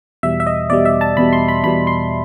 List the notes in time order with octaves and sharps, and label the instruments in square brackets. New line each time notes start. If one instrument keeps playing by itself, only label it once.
[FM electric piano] E2 B2 G3 E5
E5
D#5
E2 B2 G3 D5
E5
A5
E2 B2 G3 B5
C6
B5
E2 B2 G3 B5
C6